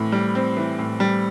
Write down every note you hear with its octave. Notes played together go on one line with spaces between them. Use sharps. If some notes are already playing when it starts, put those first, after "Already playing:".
Already playing: A2 E3 C4
G3
C4
E3
A2
G3